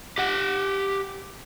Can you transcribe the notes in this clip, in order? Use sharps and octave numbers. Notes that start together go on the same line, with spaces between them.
G4 F#5